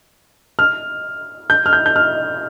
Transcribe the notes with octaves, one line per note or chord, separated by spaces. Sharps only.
F6
G6
F6
G6
G6
F6